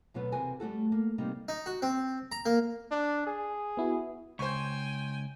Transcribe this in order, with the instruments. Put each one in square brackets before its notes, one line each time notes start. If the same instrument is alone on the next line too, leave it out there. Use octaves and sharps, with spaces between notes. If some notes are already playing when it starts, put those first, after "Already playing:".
[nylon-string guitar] D2 B2 F#3 B3 B4
E2 C3 F#4 A#4 G#5
G3 A3 F#4 A4
A#3
C3 G3 A#3 D#4
[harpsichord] D#4
F#4
C4
A#5
A#3
[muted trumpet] D4
G#4
[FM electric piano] B3 E4 F#4
[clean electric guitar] C#2 [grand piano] C5 C#6 [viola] G5 G#5